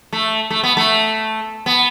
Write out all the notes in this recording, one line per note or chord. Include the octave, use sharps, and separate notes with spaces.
A3
A3
B3
A3
B3